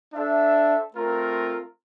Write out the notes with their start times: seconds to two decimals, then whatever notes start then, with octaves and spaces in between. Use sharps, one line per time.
0.14 D4 A4 C5 E5
0.94 A3 C4 F4 A#4